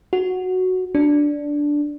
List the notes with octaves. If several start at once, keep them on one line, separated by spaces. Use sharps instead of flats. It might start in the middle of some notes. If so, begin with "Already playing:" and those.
F#4
D4